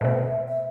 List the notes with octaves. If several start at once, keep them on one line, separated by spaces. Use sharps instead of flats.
B2 A3 C4 E5
E5